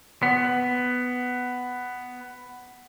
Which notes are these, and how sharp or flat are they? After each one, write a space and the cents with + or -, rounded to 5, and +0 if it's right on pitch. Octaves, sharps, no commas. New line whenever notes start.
B3 +10